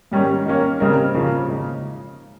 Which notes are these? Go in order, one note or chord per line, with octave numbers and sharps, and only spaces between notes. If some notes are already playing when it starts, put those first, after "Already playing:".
G#2 D#3 G3 C#4
D#3 A#3 C#4
C#3 G3 C4 D#4 A#4
C#3 F3 A#3 F4
C#3 G#3 D#4